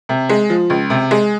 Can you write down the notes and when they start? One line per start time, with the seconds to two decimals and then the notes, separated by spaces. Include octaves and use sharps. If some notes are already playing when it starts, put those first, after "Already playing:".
0.09 C3
0.29 G#3
0.50 F3
0.70 C#2
0.90 C3
1.11 G#3